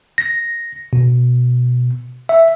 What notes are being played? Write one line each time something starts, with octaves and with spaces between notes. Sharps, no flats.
A#6
B2
E5